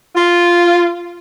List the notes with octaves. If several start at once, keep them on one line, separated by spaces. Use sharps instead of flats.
F4